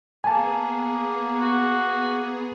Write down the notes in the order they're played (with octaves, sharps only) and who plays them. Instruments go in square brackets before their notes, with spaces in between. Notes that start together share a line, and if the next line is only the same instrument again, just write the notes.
[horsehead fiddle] A#3 [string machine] B3 G#4 [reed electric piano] G#5 A5
[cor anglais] F#4